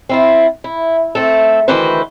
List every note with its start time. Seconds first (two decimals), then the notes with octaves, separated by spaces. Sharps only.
0.09 C4 E4 F4
0.64 E4
1.15 A3 C4 A4
1.68 D2 D#3 E3 F#4 B4 C5